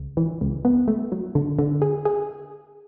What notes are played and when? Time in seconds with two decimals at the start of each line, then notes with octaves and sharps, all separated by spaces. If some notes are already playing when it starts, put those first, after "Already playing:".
Already playing: C#2
0.17 E3
0.41 C#2
0.65 B3
0.88 A3
1.12 F#3
1.35 D3
1.59 D3
1.82 G#4
2.05 G#4